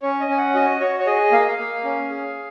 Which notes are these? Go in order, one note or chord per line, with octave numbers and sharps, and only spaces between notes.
C#4 C#5
D#5
C#4 G#5
F#5
F#4 D#5
F#4 C#5
C#5
G#4 D#5
A#3 F5
D#5
F5
A#3
C#4
G#4